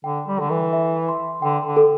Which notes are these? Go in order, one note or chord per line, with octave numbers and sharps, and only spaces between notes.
D3 G5
G3
D3 A4
E3
E5
C6
D3 G5
D3
A4